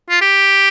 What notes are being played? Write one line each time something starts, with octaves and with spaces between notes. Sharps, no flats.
F4
G4